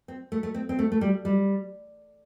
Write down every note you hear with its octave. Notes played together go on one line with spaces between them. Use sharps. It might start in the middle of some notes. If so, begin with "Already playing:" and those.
C4
A3
A3
C4
C4
A3
A3
G3
G3